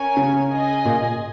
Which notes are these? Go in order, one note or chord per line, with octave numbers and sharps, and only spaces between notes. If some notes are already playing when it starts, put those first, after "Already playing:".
Already playing: C#4 A#4 C#5 G#5
C#3
G#4 D#5 G#5
A#2